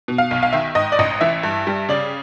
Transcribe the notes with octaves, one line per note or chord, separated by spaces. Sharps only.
B2
F5
B1
F5
D#3 E5
G#2 D#5
D5
A1 D#5
E3 E5
G2
G3
C#3 D5